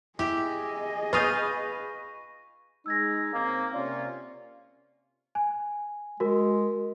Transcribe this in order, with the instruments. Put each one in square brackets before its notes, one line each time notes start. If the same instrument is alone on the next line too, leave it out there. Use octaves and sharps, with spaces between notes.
[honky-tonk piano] E4 [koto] G4 [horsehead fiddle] G#4 D#5
[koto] F4 F5 [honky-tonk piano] B4 D#6 G6 [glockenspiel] C#6 A#6 D#7
[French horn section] G#3 D#4 [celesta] E6 G#6 A#6
[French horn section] C#3 C4 [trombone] A#3
[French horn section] C3 A#3 C#4 [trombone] F4 [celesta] D5
[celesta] G#5
[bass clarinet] G#3 [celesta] F#4 A#4